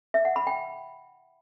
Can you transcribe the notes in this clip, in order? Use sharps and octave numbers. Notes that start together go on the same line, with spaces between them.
E5
F#5
B5
G5